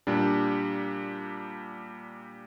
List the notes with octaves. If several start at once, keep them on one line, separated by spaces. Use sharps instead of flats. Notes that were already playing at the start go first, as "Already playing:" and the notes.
A#2 G3 D4